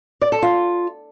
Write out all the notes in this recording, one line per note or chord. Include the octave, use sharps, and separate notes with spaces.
D5
A4
F4